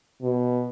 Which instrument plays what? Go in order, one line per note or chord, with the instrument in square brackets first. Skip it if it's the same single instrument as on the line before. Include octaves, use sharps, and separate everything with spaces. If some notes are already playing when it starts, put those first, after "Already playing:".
[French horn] B2